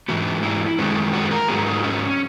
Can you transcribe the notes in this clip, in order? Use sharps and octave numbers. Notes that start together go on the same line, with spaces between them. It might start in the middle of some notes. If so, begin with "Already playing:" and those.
G#2 E3 B3 F#4
E4
F#2 D#3 G#3 B3 C#4
F#4
A#4
G#2 F#3 B3 G#4
D#4
C#4